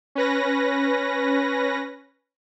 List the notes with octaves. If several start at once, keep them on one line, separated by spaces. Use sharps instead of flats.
C#4 B4 A#6